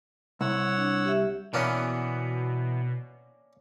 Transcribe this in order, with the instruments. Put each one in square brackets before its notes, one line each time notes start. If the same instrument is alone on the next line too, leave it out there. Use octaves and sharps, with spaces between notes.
[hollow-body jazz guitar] C2 [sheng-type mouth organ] C#5 F#5 E6
[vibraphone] D4
G4 E5
[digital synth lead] B2 [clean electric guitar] E3 B3 [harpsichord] A#3 C#4 D4